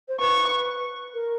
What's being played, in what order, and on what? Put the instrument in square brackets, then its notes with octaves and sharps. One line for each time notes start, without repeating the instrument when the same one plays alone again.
[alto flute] C5
[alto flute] B4 [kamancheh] C#6
[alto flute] A#4